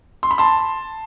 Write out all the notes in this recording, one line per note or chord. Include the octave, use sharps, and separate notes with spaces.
C6
B5
A5 C6